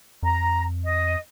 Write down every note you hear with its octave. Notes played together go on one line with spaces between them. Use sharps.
F2 A#5
D#5